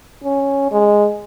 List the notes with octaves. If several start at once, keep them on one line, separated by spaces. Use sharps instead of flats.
C#4
G#3